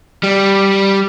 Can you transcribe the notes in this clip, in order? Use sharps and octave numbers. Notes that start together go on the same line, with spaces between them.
G3